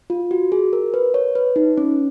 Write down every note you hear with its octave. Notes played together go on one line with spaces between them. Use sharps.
F4
F#4
G#4
A#4
B4
C#5
B4
D#4
C#4